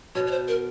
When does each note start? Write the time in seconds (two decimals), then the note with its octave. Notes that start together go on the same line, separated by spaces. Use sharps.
0.15 B2 C#5
0.27 C#5
0.32 C5
0.48 A#4